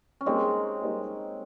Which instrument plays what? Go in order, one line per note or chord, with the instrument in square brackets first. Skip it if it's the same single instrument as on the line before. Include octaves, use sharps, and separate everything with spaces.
[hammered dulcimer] C#4
[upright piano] G3 A#3 D#4 A#4 C#5 [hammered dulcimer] G#3 C4
[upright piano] G3 A#3 D#4 A#4 C#5